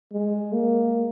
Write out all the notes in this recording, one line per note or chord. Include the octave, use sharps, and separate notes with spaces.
G#3
A#3